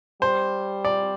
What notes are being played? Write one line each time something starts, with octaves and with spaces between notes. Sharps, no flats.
G3 C5
D5